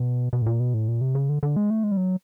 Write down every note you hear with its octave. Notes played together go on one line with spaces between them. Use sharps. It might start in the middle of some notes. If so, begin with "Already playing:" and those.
Already playing: B2
B2
A2
A#2
B2
A2
A#2
C3
C#3
D3
D3
G#3
A3
G#3
G3
F#3